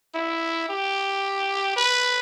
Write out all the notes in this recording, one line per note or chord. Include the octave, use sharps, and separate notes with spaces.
E4
G4
B4